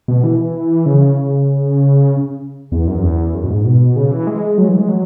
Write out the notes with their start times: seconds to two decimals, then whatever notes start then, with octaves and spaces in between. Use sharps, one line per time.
0.08 B2
0.24 E3
0.86 C#3
2.72 E2
2.88 F#2
3.03 E2
3.35 F#2
3.43 B2
3.50 G#2
3.65 B2
3.96 C#3
4.11 E3
4.27 G#3
4.58 F#3
4.68 E3
4.79 G#3
4.89 F#3